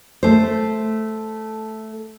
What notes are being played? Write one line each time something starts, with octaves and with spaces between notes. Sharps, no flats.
A3 C5